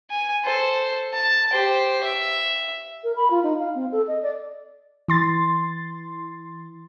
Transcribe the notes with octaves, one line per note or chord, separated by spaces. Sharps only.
G#5
A4 C5
A5
G4 C5
E5
A#4
B5
F4
D#4
F5
C4
A4
D#5
D5
E3 C6 A6